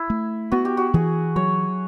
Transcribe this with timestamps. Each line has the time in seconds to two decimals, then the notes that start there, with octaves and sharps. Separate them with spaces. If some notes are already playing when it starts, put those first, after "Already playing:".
Already playing: E4
0.10 A3
0.52 B3 F#4
0.65 G4
0.77 F#4
0.94 E3 G#4
1.36 F#3 C#5